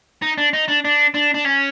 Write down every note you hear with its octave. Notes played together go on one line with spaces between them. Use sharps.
D#4
D4
D#4
D4
D4
D4
D4
C#4